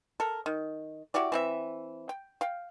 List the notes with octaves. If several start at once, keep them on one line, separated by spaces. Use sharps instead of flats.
A4 A#4
D#3
E4 F#4 G4 D5
E3 C4 E5
G5
F5 G5